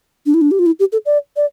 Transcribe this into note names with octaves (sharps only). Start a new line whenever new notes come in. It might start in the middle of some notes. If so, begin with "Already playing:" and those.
D4
E4
D4
G4
F4
E4
G4
A4
D5
D5